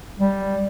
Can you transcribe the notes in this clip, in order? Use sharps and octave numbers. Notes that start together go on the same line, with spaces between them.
G3